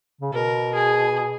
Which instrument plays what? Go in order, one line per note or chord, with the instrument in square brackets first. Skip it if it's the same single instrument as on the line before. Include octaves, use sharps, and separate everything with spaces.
[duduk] C#3
[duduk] B2 [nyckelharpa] A#4
[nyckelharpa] G#4